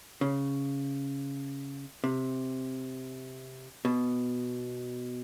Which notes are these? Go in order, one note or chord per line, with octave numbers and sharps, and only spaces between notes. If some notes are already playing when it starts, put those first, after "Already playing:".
C#3
C3
B2